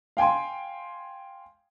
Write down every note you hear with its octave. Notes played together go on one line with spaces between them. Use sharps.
F5 G5 G#5 C6